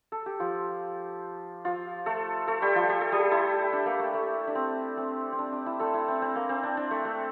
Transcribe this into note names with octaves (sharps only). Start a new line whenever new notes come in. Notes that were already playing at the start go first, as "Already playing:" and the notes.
A4
G4
F3 F4
F3 F4
A3 A4
A3 A4
G3 G4
F3 F4
G4
A4
G3 G4
E4
D4
A#3
A3
A3
D4
C4
C4
C4
D4
D4
E4
A3 A4
E4
C4
C4
A#3
C4
D4
D4
A3
A3